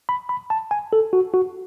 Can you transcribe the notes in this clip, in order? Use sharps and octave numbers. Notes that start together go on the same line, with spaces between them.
B5
B5
A5
G#5
A4
F#4
F#4